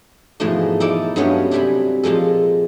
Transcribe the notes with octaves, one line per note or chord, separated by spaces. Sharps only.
G#2 B2 E3 F3 G#3 A3
D#4 E4 A4 D5
G2 F#3 A3 B3 C#4 F5
C3 F#3 G3 G#5 B5
A#2 F3 G#3 A4